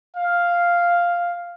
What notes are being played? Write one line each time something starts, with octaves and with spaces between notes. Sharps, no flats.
F5